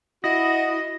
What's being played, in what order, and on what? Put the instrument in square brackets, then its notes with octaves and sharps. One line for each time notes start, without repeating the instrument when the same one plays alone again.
[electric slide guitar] E4 [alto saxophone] F#4 [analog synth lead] D#5 [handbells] A#6